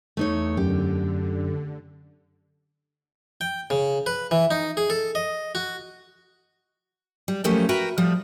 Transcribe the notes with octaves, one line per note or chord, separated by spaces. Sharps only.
E2 A3 D#4 C#5
F#2 D3 G4
G5
C#3
B4
E3
D#4
G#4
A4
D#5
F#4
G3
F3 F#3 A3 A#3 C#4 G4
F#4 A#4 B4 E5 G5
A2 F3 G3